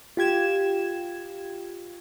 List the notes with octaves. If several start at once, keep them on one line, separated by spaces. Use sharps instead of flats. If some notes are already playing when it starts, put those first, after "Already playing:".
F4 G4 G#6 E7